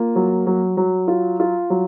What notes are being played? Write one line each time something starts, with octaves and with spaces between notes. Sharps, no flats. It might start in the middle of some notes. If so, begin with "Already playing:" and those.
Already playing: A#3 F4
F#3
F#3
F#3
F4
F4
F#3